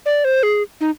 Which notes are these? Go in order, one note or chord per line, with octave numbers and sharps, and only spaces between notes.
D5
C5
G#4
D#4